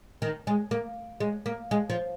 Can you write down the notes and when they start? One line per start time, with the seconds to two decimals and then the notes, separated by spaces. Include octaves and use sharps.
0.22 D#3
0.47 G#3
0.71 A#3
1.20 G#3
1.46 A#3
1.71 G#3
1.90 F3